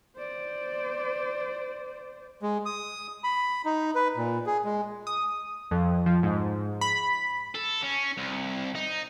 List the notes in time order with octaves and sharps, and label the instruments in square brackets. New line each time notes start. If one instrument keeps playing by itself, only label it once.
[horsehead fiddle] C5 D5
[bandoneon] G#3
D#6
B5
D#4
B4
A#2
G#4
G#3
[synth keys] D#6
F2
F3
G#2
B5
[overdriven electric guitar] A4
C#4
C2
D#4